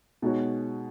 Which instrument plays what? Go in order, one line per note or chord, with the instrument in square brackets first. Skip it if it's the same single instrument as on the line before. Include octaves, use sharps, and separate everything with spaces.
[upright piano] B2 G#3 D#4 F#4 C#5